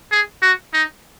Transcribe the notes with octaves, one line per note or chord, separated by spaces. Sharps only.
G#4
F#4
D#4